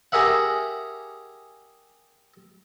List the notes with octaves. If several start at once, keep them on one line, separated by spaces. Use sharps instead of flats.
G4 G#4 A#4 E5 F#5